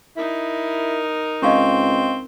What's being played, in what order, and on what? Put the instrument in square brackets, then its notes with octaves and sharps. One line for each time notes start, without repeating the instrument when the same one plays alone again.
[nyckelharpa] D#4 A#4 [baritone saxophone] E4
[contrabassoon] C#2 [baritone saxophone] C4 [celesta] D#5 F5 C#6